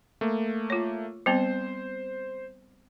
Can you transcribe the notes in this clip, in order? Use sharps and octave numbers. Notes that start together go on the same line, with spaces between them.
A3 A#3
F4 C#5
G3 B3 C4 C5